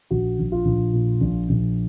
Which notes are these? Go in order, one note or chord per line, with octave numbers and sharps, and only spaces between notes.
A#1 F#4
A#1
F4
A#1
A#2
A#1
A#1